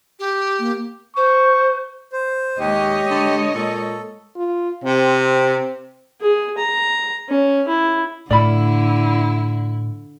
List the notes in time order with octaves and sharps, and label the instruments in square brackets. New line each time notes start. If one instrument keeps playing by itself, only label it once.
[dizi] G4
[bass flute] A#3
[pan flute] C5 [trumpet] C#6
[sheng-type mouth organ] C5
[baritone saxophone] D#2 [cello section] G#3 C#5 D#5 [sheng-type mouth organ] G4
[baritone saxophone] D3
[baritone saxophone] A#2 [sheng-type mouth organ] A4
[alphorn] F4
[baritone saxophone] C3 [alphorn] C4
[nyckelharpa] G#4
A#5
C#4
E4
[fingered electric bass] A2 [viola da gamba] D3 [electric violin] E4 [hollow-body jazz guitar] D5 B5